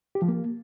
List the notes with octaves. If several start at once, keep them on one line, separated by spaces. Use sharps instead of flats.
G4
F3
A#3